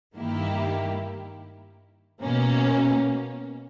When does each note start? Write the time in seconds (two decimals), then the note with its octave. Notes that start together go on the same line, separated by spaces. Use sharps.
0.14 G2 D#3 A#3 E4 G4
2.22 B2 A#3 C#4